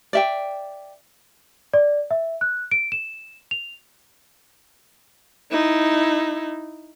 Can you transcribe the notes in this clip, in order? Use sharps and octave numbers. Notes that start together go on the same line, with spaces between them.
D5 E5 G5
D5
E5
F#6
D7
E7
F7
D#4 E4